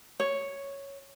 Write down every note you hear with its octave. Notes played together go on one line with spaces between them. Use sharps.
C#5